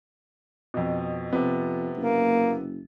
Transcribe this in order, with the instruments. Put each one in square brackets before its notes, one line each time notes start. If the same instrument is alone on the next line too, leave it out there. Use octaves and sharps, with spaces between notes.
[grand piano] F2 B2
[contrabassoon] F2 [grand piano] C3 B3
[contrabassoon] F#1 [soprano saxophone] A#3